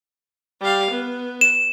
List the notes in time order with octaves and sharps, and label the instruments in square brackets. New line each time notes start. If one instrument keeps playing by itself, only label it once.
[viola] G3 F5
B3
[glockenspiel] E7